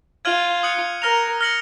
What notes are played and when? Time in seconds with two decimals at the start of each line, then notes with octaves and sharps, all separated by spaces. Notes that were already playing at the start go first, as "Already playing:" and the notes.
0.25 F4 F6 G#6 D#7 F#7
0.63 D#6 F#6 C#7 F#7
1.02 A#4 F6 A#6 F7
1.41 F6 A#6 C#7 F#7